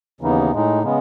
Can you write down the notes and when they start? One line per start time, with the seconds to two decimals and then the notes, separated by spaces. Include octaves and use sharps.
0.21 D#2 C#3 E3 B3 D#4
0.52 A2 G#3 D#4
0.83 C#3 G#3 B3